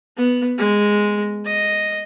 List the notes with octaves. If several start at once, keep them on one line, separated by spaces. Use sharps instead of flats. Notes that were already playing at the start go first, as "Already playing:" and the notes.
B3
G#3
D#5